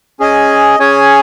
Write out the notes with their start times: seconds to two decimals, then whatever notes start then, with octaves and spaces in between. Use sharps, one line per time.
0.20 C#4 G#4 D#5 G#5
0.79 C#4 G#4 C#5 G#5